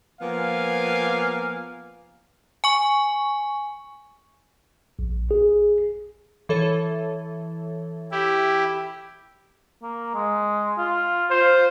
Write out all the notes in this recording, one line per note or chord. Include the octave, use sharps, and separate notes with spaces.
F3 A#3 B3 F5 G#5
G#5 C#6
A#1
G#4
E3 A4 C#5
E4 G4
A#3
G#3
F4
F4 C5